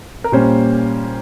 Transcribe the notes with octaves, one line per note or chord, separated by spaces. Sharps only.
A#4
A#2 G3 A#3 C#4 C5